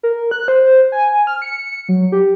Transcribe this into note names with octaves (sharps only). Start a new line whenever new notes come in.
A#4
F#6
C5
G#5
F6
C#7
F#3
G4